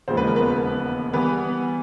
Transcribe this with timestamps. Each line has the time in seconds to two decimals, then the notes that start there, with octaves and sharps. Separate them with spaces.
0.08 E1 D#2 C#3 F3 G#3 C5
0.17 B4
0.27 A#4
0.36 B3 B4
1.13 E3 G3 B3 B4